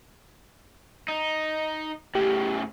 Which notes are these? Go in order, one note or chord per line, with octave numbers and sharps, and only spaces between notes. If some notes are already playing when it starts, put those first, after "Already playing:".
D#4
A2 C#3 G4